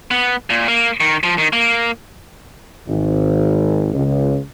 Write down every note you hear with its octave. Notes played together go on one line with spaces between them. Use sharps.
B3
A#2
A#3
D#3
F3
D#3
A#3
G#1
C#2